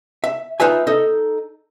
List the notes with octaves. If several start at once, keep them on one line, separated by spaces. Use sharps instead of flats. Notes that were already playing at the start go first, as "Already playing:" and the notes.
E5
D#4 F4 B4 E5 G#5
D#4 A4 D#5